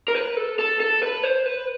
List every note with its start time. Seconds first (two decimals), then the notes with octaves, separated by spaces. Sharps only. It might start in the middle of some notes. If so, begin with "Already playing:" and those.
0.08 A#4
0.15 B4
0.37 A4
0.59 A4
0.80 A4
1.03 B4
1.23 C5
1.46 B4